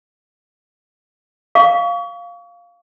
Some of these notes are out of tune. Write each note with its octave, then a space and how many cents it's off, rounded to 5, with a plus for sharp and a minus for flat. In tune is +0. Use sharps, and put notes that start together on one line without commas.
F5 +0 C#6 +35